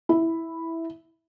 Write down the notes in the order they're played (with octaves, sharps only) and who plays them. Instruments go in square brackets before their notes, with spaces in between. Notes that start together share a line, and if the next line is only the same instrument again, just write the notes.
[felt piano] E4